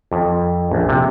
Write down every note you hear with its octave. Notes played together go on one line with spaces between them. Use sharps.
F2
A#1
C3